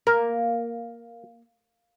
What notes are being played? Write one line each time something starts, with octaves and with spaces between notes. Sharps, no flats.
A#3 A#4